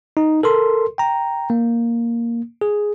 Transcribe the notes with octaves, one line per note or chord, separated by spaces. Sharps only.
D#4
A4 A#4 C6
G5 A#5
A#3
G#4